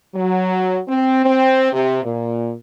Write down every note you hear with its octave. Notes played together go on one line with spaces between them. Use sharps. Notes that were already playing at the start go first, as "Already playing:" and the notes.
F#3
C4
C4
C3
A#2